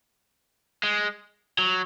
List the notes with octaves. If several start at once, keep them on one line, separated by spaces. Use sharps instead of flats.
G#3
F#3